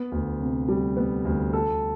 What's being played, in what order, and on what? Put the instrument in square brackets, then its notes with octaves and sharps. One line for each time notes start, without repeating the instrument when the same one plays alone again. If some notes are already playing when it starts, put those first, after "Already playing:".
Already playing: [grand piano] B3
D2
C3
G3
B3
D2
A4